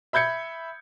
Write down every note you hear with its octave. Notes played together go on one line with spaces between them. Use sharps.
E5 B5 G6 G#6 C#7